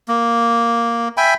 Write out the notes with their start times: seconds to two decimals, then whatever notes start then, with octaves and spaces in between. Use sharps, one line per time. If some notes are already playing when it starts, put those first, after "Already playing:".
0.08 A#3
1.17 E5 G5 G#5 B5